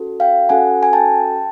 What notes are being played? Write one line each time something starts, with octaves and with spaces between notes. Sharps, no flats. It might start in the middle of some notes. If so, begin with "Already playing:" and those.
Already playing: C#4 F#4 A4
F5 G5
C#4 F#4 A4 F#5 G#5
G#5
G5 A5